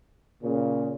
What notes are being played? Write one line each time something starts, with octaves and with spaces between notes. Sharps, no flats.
A#2 C#3